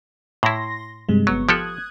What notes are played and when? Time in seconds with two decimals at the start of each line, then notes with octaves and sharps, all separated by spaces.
0.43 A2 E4 C6 A#6
1.09 G2 C3 G#3
1.27 G1 F#3 B3 C#6
1.49 F3 G4 A4 D#6 F#6 G#6